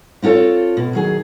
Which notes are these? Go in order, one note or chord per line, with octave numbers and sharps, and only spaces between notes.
C4 E4 F4 A4 C#5
B2
D#3 F#3 G#4